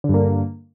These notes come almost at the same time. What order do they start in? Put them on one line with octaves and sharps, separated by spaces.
D3 G2 A#3